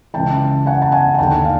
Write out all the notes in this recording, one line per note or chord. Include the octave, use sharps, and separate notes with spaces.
C#2 C#3 E3 G5 A5
F#5 G#5
A5
F#5 G#5
G#5
D#2 D3 G5 A5
F5